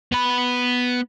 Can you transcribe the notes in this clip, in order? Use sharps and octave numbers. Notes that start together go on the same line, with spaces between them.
B3 B5